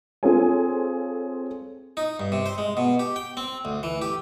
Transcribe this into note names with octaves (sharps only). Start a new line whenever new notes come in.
C4 F4 G#4 A4 C#5 G#5
D#4
G2
C3
C5
G#3
B2
G4
G5
C4
D2
E3
G4